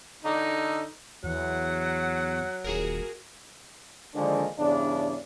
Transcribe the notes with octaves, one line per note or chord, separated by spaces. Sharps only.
D3 D#4
E2 F#3 F#5
D#1 F#4 G#4 A#4
D3 D#3 F3 G#3 A#3 D4
E2 G2 C#3 D4